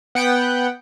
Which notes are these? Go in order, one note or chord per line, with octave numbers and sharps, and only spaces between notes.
B3 F#5 G5